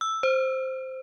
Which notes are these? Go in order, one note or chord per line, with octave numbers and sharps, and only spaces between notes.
E6
C5